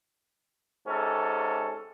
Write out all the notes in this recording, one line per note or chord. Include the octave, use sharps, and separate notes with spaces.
G#2 C3 C#4 A4